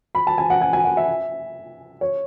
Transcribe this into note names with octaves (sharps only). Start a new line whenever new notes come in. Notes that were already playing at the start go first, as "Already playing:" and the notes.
B5
A5
G#5
F#5
G#5
G#5
F#5
E5
C#5